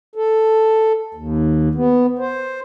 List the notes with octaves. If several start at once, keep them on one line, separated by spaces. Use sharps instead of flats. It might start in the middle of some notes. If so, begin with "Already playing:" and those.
A4
D#2
B3
C5